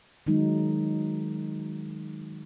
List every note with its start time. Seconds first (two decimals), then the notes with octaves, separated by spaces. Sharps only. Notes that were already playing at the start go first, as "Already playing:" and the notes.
0.27 D#3 F#3 G#3 D#4